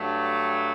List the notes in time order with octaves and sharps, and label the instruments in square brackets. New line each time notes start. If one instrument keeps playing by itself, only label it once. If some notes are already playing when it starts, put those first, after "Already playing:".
Already playing: [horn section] G2 F#3 A3